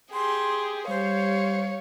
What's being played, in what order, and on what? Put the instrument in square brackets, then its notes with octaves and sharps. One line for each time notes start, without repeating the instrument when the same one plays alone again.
[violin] G4 G#4 [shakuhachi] C6
[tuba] G3 [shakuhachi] C5 [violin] C#5 F5